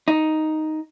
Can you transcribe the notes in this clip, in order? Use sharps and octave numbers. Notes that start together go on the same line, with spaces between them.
D#4